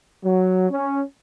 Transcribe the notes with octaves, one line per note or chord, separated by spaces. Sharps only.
F#3
C#4